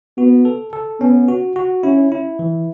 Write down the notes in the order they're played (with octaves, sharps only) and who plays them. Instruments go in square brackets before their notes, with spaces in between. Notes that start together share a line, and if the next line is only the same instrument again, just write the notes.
[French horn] B3 [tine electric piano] F#4
[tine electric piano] A4
A4
[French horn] B3 [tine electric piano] C#4
[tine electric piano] F#4
F#4
[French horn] C#4 [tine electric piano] E4
[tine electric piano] E4
E3